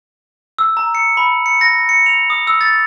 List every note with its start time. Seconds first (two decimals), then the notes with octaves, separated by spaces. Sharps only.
0.59 E6
0.77 A#5
0.95 C#7
1.17 B5
1.46 C#7
1.61 A#6
1.89 C#7
2.06 F7
2.30 D#6
2.47 E6
2.61 A6